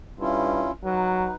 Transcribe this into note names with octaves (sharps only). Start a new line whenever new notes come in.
G2 C#4 E4 F4
F#3 D#4 B4